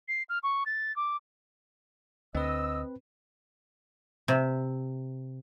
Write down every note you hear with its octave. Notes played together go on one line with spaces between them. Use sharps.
C7
F6
C#6
A6
D6
D2 C4 B4 D#5 E6
C3